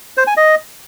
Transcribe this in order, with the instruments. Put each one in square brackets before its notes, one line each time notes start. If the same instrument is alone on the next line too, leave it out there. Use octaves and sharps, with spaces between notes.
[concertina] C5
G#5
D#5